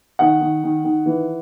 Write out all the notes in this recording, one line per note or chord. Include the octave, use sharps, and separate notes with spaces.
D#3 F#5
D#3
D#3
D#3
E3